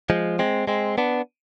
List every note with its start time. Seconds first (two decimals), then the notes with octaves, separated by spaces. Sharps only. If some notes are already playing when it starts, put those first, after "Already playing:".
0.10 F3 G#3
0.39 G#3 C4
0.68 G#3 C4
0.98 B3 D4